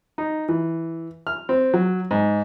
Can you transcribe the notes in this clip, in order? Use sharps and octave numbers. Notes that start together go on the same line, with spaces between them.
D#4
E3
F6
C4
F#3
G#2